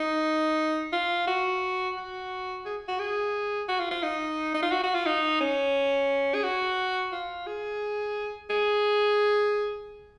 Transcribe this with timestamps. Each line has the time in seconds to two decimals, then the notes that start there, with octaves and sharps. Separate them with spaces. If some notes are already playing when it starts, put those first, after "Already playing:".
Already playing: D#4
0.93 F4
1.27 F#4
1.97 F#4
2.65 G#4
2.88 F#4
2.99 G#4
3.68 F#4
3.80 F4
3.91 F4
4.03 D#4
4.54 D#4
4.63 F4
4.71 F#4
4.83 F#4
4.94 F4
5.06 D#4
5.40 C#4
6.34 G#4
6.43 F#4
7.12 F4
7.46 G#4
8.50 G#4